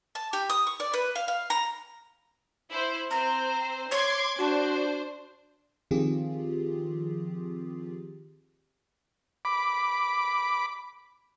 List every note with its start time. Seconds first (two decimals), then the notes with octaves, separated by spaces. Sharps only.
0.15 A5
0.33 G4
0.50 D#6
0.67 C#6
0.80 D5
0.94 B4
1.15 F5
1.28 F5
1.50 A#5
2.69 E4 C5
3.11 C4 C5 A#5
3.91 C#5 C6 D6 G#6
4.38 D4 F#4 C5
5.91 D#3 F3 C4 F4 G4 G#4
9.45 B5 D6